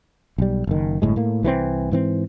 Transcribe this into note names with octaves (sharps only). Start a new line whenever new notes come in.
B1 G3
F#1 D#3
G1 A2 G#3
A2 A#3
C2 E3 G3 C4
G#2 E3 C4